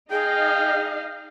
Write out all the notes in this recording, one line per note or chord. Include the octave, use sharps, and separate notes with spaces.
D#4 G#4 D#5 F5 G5